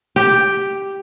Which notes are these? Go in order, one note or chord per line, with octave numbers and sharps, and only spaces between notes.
G4